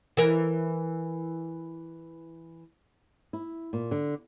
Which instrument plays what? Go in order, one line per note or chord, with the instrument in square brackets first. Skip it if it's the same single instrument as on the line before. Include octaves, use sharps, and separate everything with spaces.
[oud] E3 A#4
[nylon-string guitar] E4
A#2
D3